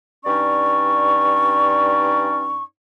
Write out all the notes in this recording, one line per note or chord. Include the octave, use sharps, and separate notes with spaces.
G2 C#4 D#4 D5 C#6